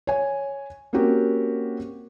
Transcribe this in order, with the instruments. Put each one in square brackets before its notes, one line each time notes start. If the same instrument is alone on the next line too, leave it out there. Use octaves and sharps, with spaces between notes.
[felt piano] C#5 G#5
A#3 C4 C#4 F#4 G4 A#4